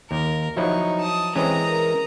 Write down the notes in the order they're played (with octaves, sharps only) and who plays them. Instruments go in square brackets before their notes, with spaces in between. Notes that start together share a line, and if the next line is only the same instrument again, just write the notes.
[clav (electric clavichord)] D#2 [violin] A#4
[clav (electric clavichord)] F3 F#3 E4 [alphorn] D#4 [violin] C#6
[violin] A5 D#6
[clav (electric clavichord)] E3 G#3 C#4 [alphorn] C4 [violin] A#5 D#6
[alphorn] A#4